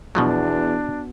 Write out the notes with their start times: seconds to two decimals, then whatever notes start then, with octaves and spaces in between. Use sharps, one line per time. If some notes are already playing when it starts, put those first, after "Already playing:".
0.15 E2 B2 F3 F#3 B3 D4 F#4